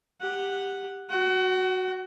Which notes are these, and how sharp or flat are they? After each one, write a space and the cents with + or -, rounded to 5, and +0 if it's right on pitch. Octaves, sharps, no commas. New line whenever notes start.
G4 +10 F#5 +0
F#4 +0 F#5 +35